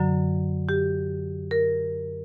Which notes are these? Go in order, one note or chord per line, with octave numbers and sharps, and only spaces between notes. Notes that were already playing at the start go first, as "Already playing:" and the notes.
Already playing: F#2 D3 F#3
G4
A#4